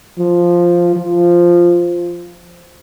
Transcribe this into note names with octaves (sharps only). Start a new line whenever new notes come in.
F3
F3